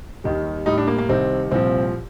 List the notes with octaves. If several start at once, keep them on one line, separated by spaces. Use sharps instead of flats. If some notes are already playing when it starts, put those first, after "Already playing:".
D#2 D#3 G3
A2 G3 D#4
D4
A#3
A#3
C2 C3 D#3 C4
C2 A#2 F3 C4